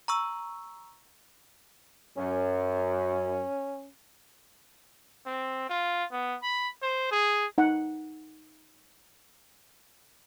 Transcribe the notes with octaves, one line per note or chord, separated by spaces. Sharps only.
A#5 C#6 E6
F#2 C#4
C4
F4
B3
B5
C5
G#4
D#4 F#5